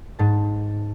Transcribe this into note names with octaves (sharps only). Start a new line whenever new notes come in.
G#2 A5